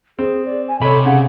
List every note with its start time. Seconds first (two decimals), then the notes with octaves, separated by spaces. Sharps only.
0.19 C4 G#4
0.46 D5
0.68 G#5
0.82 C3 A4 C#5 B5
1.05 C#3 F#5